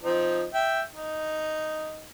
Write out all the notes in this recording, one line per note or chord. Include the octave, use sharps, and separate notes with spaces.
F3 C4 D#4
E5 G5
D#4